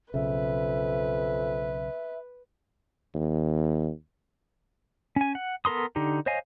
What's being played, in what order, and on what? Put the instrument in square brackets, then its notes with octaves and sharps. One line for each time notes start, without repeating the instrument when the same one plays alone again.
[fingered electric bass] B1 C#3 [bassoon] F2 [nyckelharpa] B4 [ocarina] E5
[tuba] D#2
[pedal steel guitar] C#4 G#5
F#5
B3 A4 A#4 C6 D#6
D3 D#4 G4
C5 C#5 D#5 F5 G#5